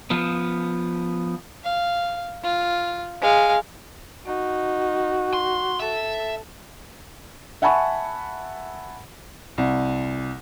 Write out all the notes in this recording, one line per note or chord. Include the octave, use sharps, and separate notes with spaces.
F3 B3
F5
F4
G#3 F5
D#4 F#4
C6
A4 E5
E5 F#5 G#5 A5 B5 C#6
C2